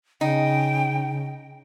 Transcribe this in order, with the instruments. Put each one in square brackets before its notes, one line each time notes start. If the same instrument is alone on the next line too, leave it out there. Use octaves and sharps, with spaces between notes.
[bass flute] C#3 [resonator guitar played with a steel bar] D#4 [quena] G5